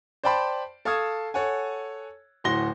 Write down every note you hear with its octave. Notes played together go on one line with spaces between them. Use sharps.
C5 D5 G5 A5 B5 C6
A4 F5 A5 C#6 D#6 G#6
A4 C#5 F#5 G#5
D1 A2 F#4 C6 A#6 G7